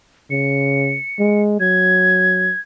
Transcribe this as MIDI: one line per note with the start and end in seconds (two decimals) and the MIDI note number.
0.31 0.97 49
0.31 1.42 97
1.19 1.58 56
1.60 2.52 54
1.60 2.59 92